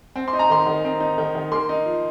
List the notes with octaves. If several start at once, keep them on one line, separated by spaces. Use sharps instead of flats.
C4
C6
D#4
A#5
D#3 C6
D#3
C4
D#4
D#3
D#3
A#3 C6
D#4
F3